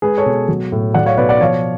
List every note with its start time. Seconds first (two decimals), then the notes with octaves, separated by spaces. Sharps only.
0.02 G#3 G#4 B4
0.18 A4 C#5
0.26 B2
0.48 F#3
0.72 A2
0.94 F#3 D5 F#5
1.06 C#5 F5
1.17 B2 B4 D5
1.29 D5 F#5
1.40 F3 C#5 F5